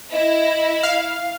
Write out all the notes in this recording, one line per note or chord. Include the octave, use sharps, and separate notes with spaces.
E4 D#5
F5